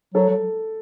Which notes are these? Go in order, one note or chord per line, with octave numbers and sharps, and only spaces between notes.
F#3 A4
F#3